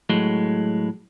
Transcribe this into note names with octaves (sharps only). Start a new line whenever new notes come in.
A2 F#3 G#3